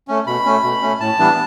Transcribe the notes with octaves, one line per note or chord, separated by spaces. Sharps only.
A3 C#4
B2 B5
A3 C#4
B2
A3 C#4
A2 A5
E3 G3 B3 D4